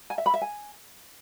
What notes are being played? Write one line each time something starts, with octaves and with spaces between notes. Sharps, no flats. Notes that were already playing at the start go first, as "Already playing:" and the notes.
G#5
E5
B5
E5
G#5